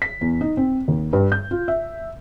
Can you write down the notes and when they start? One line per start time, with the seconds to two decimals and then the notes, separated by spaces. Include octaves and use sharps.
0.02 B6
0.21 E2
0.41 D#4
0.57 C4
0.88 D#2
1.13 G2
1.32 G6
1.51 F4
1.68 E5